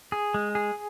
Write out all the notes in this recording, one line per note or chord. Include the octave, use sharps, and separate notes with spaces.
G#4
G#3
G#4